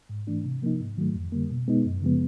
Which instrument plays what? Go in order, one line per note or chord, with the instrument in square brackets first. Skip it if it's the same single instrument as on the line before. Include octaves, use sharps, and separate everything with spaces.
[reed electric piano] G#2
E3 A3 D4
C3
F3 A#3 D#4
G#2
D#3 F#3 A3
F2
D3 G3 A#3
B2
G#3 B3 D#4
F#2
C#3 F3 G#3 B3